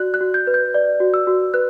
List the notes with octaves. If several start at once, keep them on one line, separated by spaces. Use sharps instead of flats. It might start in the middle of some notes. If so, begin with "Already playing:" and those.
Already playing: F#4 D5 F#6
F#6
F#4
G6
B4
G6
D5
F#4
E6
F#4
B4 F#6